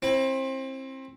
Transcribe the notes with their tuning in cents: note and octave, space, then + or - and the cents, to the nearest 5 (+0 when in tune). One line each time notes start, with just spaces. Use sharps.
C4 +25 E4 +0